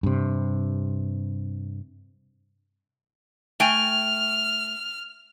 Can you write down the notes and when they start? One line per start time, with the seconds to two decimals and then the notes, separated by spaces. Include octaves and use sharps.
0.03 G2 C3
3.60 A3 G5 G#5 F6